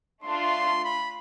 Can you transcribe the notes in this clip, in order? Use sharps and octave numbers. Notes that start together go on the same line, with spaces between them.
A3 D4 F4 C6
B5